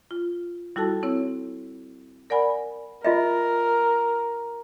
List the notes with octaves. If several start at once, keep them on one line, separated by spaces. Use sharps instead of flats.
F4
G3 E4 F#4 A4 A5
C4 E4 C#5
A#4 D5 F#5 G#5 B5
F4 A#4 D#5 E5